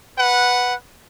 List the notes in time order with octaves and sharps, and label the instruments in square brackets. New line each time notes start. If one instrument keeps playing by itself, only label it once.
[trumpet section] B4 F#5